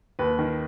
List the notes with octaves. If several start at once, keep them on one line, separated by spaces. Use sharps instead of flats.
D#2 B4
D#3